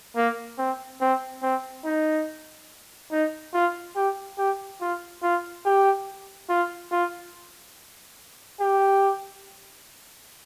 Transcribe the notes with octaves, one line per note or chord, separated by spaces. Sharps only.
A#3
C4
C4
C4
D#4
D#4
F4
G4
G4
F4
F4
G4
F4
F4
G4